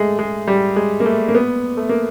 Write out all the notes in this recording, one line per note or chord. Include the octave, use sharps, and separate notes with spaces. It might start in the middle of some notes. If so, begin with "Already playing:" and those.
Already playing: G#3 A3
G#3
G3
G#3
A#3
A3
A#3
B3
A3
A#3